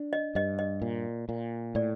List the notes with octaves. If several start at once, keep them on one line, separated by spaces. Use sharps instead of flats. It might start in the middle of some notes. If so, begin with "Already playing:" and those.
Already playing: D4
D#5
G2 D#5
D#5
A#2
A#2
A2 D5